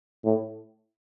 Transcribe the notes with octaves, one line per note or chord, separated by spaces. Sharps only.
A2